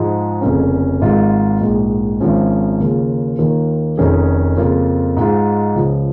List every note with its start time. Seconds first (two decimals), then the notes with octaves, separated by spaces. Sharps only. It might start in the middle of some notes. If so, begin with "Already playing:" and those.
Already playing: G#2 F3 G#3
0.41 F1 F2 C#3 A#3 C#4
1.02 G#1 G#2 G#3 F4
1.60 A#1 G#2 G#3
2.20 G#1 G#2 F3 C#4
2.80 D#2 C#3 A#3 F4
3.39 D#2 D#3 A#3 F4
3.97 F1 F2 D#3 C#4 G#4
4.57 F2 C#3 A#3 F4
5.17 G#2 G#3 F4
5.75 C#2 C#3 F3